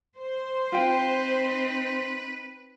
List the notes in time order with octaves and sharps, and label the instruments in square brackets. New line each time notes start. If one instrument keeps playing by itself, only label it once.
[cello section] C5
[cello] C4 D#4 [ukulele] F4 G5 [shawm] B4